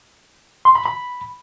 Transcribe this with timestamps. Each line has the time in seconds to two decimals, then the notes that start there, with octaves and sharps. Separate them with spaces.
0.65 C6
0.75 B5
0.85 B5